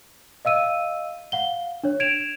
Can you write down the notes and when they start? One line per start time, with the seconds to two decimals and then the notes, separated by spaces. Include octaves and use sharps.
0.45 D#5 F5 E6 D#7
1.32 F5 F#5 G7
1.84 D4 C#5
2.00 G#6 D7 E7 F7